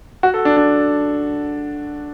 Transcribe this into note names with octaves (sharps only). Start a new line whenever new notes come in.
F#4
A4
D4
D4